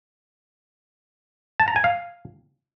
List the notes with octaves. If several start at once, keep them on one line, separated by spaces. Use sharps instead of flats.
A5
A#5
G#5
F5